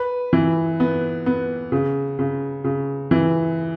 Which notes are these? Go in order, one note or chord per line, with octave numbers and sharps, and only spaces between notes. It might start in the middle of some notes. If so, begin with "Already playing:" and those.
Already playing: B4
E3
B3
B3
C#3
C#3
C#3
E3